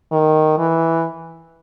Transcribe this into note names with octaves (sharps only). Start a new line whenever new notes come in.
D#3
E3